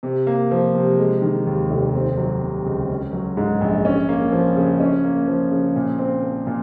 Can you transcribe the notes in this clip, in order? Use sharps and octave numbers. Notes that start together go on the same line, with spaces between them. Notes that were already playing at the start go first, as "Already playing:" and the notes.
C3
A#3
F3
C3
G#3
D#3
D#2
F1
C4
F#3
C3
C#2
C#4
F#3
G#2
A#1
C#4
A#3
F3
C#3
C#4
A#3
F3
C#3
A#2
C4
F3
A#2